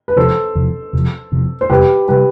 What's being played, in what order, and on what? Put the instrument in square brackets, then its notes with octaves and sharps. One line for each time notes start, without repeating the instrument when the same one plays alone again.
[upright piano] B4
[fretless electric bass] E1 E2 C3 F3 [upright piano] A4 C5
[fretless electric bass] E1 E2 C3 F3
E1 E2 C3 F3
E1 E2 C3 F3
[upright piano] C5
[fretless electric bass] F1 E2 C3 G3 [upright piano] G4 B4
[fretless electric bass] C3 G3 [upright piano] G4 B4